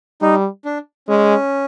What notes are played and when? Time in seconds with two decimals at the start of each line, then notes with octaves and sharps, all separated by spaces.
0.21 G3 D#4
0.65 D4
1.08 G#3 C#4